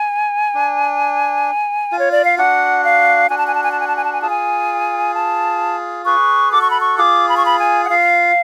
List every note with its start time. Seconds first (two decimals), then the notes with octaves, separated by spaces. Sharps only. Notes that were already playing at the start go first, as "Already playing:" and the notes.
Already playing: G#5
0.54 D4
1.92 F4
1.99 C#5
2.12 D5
2.25 F5
2.38 D4 F#4 F#5
2.84 F5
3.30 D4 F#4 G#5
3.38 A5
3.47 G#5
3.55 A5
3.63 G#5
3.72 A5
3.80 G#5
3.88 A5
3.97 G#5
4.04 A5
4.13 G#5
4.21 F4 G#4 A5
4.30 G#5
5.14 A5
6.05 G#4 B4 C#6
6.52 F#4 A4 D6
6.62 C#6
6.71 B5
6.81 C#6
6.98 F4 G#4 D6
7.29 B5
7.37 C#6
7.46 B5
7.59 G#5
7.85 F#5
7.90 F4 F5